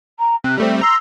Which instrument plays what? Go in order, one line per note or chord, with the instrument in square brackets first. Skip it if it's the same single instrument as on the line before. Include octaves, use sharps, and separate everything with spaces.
[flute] A#5
[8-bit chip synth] C3 [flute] F#6
[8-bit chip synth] G3 A3 C4 [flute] E5
[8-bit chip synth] A#5 C6 [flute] E6